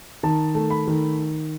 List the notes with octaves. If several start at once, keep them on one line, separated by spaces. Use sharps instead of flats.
D#3 A5
A3
B5
D#3